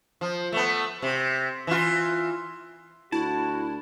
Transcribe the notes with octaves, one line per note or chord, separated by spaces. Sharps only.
F3
A3 B3
C3
E3 F4
D2 E4 F#4 A5